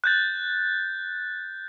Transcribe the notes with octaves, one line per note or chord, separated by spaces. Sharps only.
F#6 G6 A6